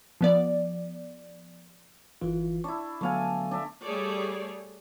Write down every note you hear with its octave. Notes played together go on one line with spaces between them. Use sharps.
F3 B3 D5
G1 E3 F4
D4 E4 C#6
D3 F#3 A3 B3 F5 G#5
D4 E5
G3 A3 G#4 A4 C#5 D5